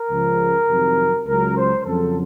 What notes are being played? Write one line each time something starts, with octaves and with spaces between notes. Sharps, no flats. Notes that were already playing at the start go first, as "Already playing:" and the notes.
Already playing: A#4
C#2 C#3 F3
F2 C3 D#3 F#3
C#2 C#3 F#3 A#4
C5
F2 C#3 F#3 A4